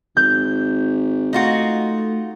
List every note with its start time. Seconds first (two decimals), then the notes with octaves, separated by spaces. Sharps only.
0.17 G#1 G6
1.33 A3 D#4 F4 F#4